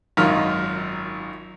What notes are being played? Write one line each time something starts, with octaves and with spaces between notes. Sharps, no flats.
G#1 F#2 D#4 F4 A#4 F6